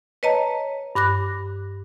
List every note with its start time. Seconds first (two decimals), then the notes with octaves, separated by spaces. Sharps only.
0.23 B4 C#5 D#5 A5 A#5
0.95 G2 D6 F#6 A#6